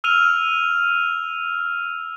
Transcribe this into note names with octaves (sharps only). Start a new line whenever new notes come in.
E6 F6 D#7 F7